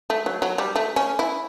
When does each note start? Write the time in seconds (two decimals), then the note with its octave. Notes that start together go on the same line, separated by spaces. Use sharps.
0.10 A3
0.26 F#3
0.42 F#3
0.58 G3
0.76 A3
0.96 C#4
1.19 E4